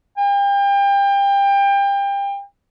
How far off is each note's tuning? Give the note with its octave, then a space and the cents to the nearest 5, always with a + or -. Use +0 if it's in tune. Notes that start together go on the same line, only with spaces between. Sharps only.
G5 +30